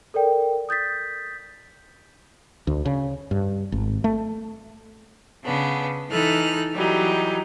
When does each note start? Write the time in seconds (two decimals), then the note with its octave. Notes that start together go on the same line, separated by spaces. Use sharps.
0.14 A4 A#4 D5 G5
0.69 D#6 G6 A6 B6
2.67 D2
2.85 C#3
3.31 G2
3.72 G#1
4.04 A3
5.44 C#3 B3 D4
6.09 E3 D#4 A4 F6 F#6
6.73 E3 F#3 G3 D#4